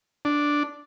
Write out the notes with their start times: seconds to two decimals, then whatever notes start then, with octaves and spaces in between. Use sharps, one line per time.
0.25 D4